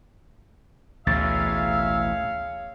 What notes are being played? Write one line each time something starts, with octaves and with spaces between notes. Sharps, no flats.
A1 D2 B2 G#4 C#5 E5 F5 A6